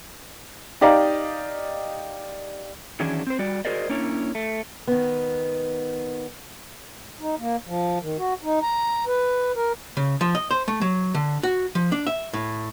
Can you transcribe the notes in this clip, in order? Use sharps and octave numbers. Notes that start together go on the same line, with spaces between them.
D#4 G4 D5 D#5 F5 A#5
D#3 E3 F#3 C#4 D4 G#4
C4 C5
G3 F#4 D5
F#4 G#4 A#4 C5 D5 D#5
A#3 C#4 D4 E4 C#5
A3
D#3 B3
D#4
A#3
F3
D#3
F#4
D#4
A#5
B4
A#4
C#3
F3
D#5
C5
A3
F#3
D3
F#4
F3
D4
E5
A2